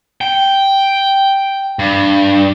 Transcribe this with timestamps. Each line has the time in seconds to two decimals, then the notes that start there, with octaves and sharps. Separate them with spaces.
0.21 G5
1.79 G2